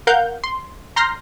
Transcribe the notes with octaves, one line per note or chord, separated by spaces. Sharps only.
A#4 F5 F#5 G6
C6
A#5 C6 F6 G6 A#6 C7